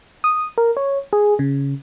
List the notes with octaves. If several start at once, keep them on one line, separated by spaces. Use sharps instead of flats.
D#6
A#4
C#5
G#4
C#3